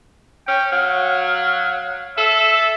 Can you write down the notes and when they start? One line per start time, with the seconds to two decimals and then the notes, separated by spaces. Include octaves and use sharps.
0.48 C#4 G5
0.72 F#3 F5
2.18 A4 E5